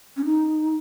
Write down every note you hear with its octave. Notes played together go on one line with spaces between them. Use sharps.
C#4
D#4